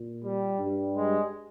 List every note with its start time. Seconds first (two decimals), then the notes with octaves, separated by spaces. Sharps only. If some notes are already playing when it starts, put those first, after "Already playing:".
Already playing: A#2
0.23 G3
0.59 G2 G3
0.96 G#3